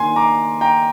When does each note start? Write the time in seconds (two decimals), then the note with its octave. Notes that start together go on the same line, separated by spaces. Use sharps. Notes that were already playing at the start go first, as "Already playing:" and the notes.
Already playing: D#3 A#3 D4 G#5 C6
0.16 A#5 D6
0.61 G5 A#5